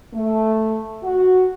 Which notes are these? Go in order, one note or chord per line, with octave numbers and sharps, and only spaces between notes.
A3
F#4